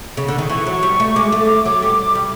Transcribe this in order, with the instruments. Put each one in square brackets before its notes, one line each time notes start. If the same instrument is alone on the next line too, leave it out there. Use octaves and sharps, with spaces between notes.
[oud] C#3
D3
D#3
[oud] E3 [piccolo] C#6
[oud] F#3
G3
A3
[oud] G#3 [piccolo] D6
[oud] A3
F#3
G3
G3